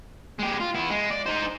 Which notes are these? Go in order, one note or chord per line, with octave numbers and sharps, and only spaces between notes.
G#3 G4
F4
B3 E4
G#3
D5
D#4 C5